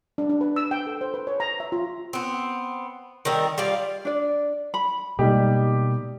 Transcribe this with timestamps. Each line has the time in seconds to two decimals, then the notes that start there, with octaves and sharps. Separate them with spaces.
0.18 D4
0.29 D4
0.41 B4
0.56 E6
0.71 G5
0.87 A4
1.01 C5
1.14 B4
1.27 C#5
1.40 A#5
1.60 E5
1.72 F4
2.13 B3 C4
3.25 D#3 G3 C4 A#4
3.58 G3 F4 D5 F5
4.05 D4 D5
4.74 B5
5.19 B2 G3 G#3 A#3 D#4 G4